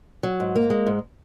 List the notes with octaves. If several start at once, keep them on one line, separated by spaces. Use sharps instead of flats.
F#3
G#2
A#3
G#3
G#2